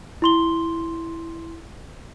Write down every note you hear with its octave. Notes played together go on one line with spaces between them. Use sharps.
E4 C6 G7